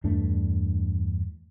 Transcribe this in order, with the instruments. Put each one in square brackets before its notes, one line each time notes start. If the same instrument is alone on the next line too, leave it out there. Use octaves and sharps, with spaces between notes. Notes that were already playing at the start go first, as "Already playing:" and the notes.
[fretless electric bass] E2 G2 A3 D4